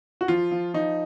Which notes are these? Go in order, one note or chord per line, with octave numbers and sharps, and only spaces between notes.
F#4
F3 F4
F3
F3 D#4